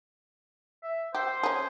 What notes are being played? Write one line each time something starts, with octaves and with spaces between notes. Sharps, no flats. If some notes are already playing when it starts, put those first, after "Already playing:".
E5
G4 C5
C#4 G#4